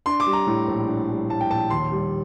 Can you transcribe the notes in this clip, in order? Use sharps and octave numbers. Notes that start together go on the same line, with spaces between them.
D4 C6
D6
G3
A#5
A2
A#1
D4
G3
A2 A5
G5
A#1 A5
D#2 C6
G3